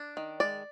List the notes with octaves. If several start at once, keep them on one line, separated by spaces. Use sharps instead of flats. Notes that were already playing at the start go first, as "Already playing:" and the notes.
Already playing: D4
D#3
G#3 D5